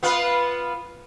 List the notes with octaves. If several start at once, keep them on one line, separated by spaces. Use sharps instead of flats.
B3 F4 B4